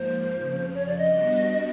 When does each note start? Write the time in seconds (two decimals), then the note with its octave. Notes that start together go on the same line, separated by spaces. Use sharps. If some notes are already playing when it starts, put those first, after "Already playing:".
Already playing: G#2 F3 A#3 C5
0.38 F2 C#3 F3
0.74 C#5
0.86 D5
0.98 D#5
1.10 G3 B3 D4 F#4